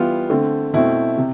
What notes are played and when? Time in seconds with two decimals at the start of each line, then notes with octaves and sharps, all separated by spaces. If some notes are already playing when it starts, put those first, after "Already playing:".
Already playing: E3 G3 B3 F4
0.30 D3 A3 C4
0.73 B2 A3 C4 E4
1.17 C3